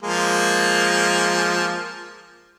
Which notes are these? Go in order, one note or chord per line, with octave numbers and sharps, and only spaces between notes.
F3 G#3 A#3